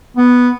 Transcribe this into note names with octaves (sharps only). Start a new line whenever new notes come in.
B3